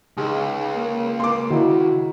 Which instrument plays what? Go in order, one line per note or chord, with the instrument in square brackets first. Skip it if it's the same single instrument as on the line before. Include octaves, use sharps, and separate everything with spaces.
[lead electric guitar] C#2 [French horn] D#4 [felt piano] G#4
[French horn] A#3
[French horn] A#3 [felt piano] C6 D6
[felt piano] D#3 E4 [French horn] F#4